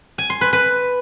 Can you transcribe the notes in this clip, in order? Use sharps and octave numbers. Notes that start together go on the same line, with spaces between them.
G#5
C6
B4
B4